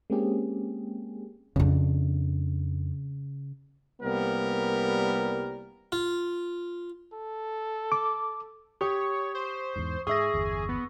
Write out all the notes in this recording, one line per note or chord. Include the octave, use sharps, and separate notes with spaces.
G#3 A#3 C4 C#4 G4 G#4
F2 C#3 D4
C2 G3 A#3 B3 A#4
F4
A4
D6
G4 C#5 C#6 D#6
C5
E2 G#2
G#2 G#4 E5 C#6 D#6 E6 A#6
G1 E2
B3